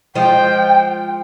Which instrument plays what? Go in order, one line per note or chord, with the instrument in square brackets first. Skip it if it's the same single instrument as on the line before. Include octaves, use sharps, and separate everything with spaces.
[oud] F3 G#3 F4 [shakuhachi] G5